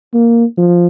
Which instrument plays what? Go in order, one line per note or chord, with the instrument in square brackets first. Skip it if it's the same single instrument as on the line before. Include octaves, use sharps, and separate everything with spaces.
[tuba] A#3
F3